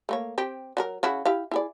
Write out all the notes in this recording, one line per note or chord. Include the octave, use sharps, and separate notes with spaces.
A3 A#3 C#5
C4 G4
F#3 F#4 A#4
C#3 E4 F#4
E4 G4 F5
E4 G#4 D5